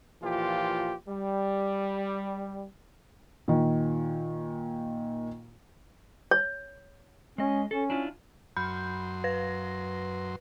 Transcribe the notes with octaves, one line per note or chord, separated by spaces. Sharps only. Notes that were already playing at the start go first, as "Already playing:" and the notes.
A#2 E3 F3 F4 G4
G3
A#2 D#3
C#5
G#3 C#4 D#5
C#4 A4
D4 E4 F4
F#2 B5 C6 G6
B4 A#6